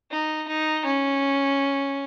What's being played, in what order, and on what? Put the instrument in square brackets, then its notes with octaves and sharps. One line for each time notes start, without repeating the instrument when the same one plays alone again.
[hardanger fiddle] D#4
D#4
C#4